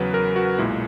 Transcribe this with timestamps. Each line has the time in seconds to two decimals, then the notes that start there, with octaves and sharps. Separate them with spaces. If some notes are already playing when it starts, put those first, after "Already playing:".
Already playing: E2 C#3 F#3 B4
0.14 A#4
0.36 F#4
0.58 B1 A#2 G#3 E4